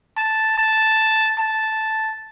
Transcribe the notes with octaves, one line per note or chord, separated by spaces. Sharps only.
A5
A5
A5